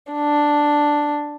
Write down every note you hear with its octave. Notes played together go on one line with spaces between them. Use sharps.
D4